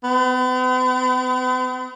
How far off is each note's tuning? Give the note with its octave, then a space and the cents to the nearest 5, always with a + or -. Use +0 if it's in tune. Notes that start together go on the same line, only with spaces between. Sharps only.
B3 +45